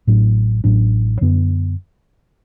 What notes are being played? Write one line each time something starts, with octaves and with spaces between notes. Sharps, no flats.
A1 A2 F#3 D4
A1 A2 F#3 D4
F#2 D3 B3